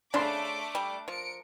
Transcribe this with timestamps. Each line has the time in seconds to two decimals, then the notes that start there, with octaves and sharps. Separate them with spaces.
0.14 C#3 A3 D4 C6 D6
0.75 G3
1.08 F3 A#4 C#7 D7